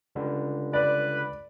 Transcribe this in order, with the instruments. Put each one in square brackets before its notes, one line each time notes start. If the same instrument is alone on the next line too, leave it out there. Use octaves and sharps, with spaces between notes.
[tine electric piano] C#2 D3 G3
[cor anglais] B4 [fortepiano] D5